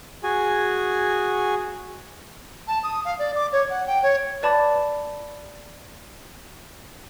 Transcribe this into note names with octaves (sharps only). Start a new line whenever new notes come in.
F#4 G#4 G#5
A5
D#6
F5
D5
D6
C#5
F#5
G5
C#5
B4 D5 A5 B5 D6 A6